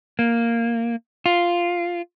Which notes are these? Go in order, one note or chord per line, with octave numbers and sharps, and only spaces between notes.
A#3
F4